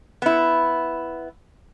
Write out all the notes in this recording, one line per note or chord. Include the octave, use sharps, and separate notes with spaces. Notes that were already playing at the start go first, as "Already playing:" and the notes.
B3 E4